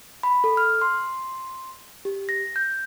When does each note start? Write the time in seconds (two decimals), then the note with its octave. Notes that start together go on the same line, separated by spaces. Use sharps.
0.23 B5
0.44 A4
0.57 F6
0.82 C6
2.05 G4
2.29 A#6
2.56 G6